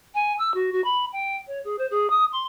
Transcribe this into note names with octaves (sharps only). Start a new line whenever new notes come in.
G#5
E6
F#4
F#4
B5
G5
C#5
G#4
C5
G#4
D#6
C6